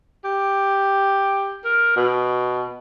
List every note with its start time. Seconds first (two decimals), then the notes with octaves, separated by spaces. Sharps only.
0.24 G4
1.65 A#4
1.96 B2